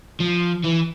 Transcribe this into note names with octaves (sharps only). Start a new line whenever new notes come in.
F3
E3